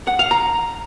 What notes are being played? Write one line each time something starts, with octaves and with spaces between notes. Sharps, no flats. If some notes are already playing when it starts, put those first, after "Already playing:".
F#5
F5
A#5